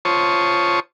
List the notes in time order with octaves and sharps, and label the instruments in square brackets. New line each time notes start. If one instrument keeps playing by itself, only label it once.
[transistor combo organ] F4 C5 C#5 A5 C#6 D#6